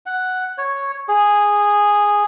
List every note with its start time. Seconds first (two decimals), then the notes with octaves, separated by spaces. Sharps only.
0.06 F#5
0.58 C#5
1.08 G#4